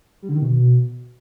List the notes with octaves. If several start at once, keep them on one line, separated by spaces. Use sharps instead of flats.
G3
D3
D#3
B2